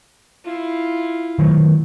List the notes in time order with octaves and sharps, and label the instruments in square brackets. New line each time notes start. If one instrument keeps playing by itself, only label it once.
[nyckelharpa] E4 F4
[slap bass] D#3 F#3 A3